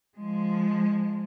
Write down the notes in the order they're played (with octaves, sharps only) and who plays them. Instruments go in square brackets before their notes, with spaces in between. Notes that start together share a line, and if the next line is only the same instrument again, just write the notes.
[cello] F3 G#3